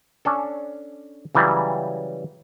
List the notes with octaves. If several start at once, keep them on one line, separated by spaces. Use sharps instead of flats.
C#4 D4 A4
C#3 E3 F#3 G3